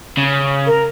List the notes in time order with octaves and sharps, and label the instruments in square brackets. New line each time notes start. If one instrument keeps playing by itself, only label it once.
[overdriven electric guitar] C#3
[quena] A#4